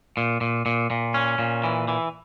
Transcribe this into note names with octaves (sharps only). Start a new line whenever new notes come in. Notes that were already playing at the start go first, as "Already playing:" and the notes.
A#2
A#2
A#2
A#2
C#4
A#2
E3
E3